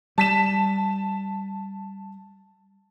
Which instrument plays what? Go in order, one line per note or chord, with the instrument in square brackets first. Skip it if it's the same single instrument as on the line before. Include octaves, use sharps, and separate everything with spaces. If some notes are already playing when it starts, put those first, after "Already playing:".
[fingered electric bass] G3 [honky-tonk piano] A5 B6 E7